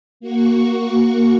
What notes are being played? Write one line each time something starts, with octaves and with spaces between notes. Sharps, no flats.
A#3 F#4 C#6